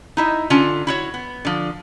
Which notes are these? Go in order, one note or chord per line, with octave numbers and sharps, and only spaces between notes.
D#4 E4 D#5
D3 C#4 F4 A5
E4 F#4 C#5
B3
D3 F3